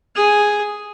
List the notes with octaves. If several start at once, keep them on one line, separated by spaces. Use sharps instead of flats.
G#4